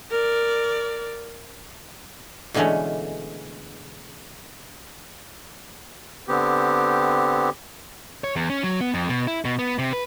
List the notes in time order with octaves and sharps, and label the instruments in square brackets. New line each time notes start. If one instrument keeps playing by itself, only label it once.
[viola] A#4 D5
[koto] B2 D3 E3 G#3 A3 C#4
[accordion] D3 B3 C4 G4
[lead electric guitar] C#5
E2
C#4
F#3
B3
F2
B2
E4
B2
B3
C3
B4